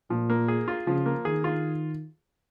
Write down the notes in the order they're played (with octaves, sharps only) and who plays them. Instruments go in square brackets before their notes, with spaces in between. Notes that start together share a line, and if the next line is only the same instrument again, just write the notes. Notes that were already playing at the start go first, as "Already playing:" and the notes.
[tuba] A#2 [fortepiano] F3
[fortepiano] A#3
G#4
F4
[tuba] C#3 [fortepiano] F3
[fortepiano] A#3
[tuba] D#3 [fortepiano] G#4
[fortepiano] F4